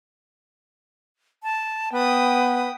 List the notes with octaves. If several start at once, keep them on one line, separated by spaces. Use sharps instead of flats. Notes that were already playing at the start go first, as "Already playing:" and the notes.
A5
B3 B4 G5 D#6